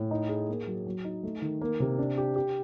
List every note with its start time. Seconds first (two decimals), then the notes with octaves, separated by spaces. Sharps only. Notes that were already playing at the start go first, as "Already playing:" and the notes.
Already playing: A2
0.11 D#4
0.29 G#4
0.49 A#3
0.67 F#3
0.86 F#3
1.04 D#4
1.23 A3
1.42 D#3
1.61 A#3
1.80 C3
1.99 D4
2.18 G4
2.36 G4